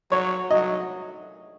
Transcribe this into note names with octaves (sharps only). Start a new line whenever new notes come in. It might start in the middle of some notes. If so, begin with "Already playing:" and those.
F#3 C#5
F#3 D#5